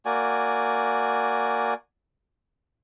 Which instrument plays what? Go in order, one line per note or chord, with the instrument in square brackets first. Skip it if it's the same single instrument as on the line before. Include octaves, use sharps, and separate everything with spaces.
[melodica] A#3 F#4 D5 G#5